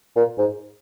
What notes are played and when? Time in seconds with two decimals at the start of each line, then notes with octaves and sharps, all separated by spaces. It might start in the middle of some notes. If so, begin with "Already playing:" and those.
0.16 A#2
0.38 G#2